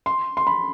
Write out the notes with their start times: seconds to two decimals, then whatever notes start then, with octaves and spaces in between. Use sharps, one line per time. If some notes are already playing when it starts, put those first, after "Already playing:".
0.06 C6
0.37 C6
0.47 B5